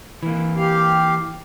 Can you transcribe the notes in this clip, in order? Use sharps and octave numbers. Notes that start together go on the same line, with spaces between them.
E3 A#3
G4 F5